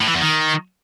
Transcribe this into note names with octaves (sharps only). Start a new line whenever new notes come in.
A2
E3
E2
D#3